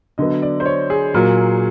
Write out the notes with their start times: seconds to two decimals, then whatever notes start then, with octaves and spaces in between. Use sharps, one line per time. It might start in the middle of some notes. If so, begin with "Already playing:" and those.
0.18 D3 F#3 B3 D#5
0.42 D5
0.60 C5
0.66 C#5
0.90 G#4
1.14 A#2 F#3 A#3